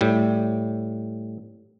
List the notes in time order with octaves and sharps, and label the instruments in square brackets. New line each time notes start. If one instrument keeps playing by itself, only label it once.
[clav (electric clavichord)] A2 G3